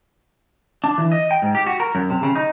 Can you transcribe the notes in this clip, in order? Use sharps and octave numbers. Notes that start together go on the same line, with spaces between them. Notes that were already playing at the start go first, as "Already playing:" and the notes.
D4
E3
D#5
G5
G#2
G4
F#4
A#4
F#2
C3
C#3
D#4